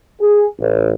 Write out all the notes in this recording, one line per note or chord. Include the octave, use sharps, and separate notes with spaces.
G#4
A1